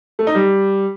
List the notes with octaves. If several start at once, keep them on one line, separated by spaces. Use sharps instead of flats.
A3
D#4
G3